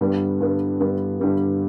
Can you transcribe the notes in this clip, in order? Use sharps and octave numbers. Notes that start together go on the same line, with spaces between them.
G2 D3 G3 B3
G2 D3 G3 B3
G2 D3 G3 B3
G2 D3 G3 B3